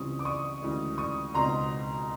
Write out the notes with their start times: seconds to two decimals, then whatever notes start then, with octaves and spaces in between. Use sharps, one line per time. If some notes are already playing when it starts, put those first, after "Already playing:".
Already playing: C#2 C#3 E3 G3 C4 C#6 D#6
0.19 D6
0.25 C#6 D#6
0.62 D2 C#3 E3 G#3
0.98 C#6 D#6
1.34 C#2 B2 G#3 C4 D#4 A#5 C6